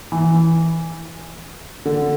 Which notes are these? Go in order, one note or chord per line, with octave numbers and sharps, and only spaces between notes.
E3
D3